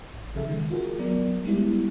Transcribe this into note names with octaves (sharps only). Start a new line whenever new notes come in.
A1
C#3 F3 G#4 A4 E5
D#3 G#3
F4 F#4 G#4 A#4
F#3 B3 A#4 D5
G3 G#3 B3 D4 E4 G4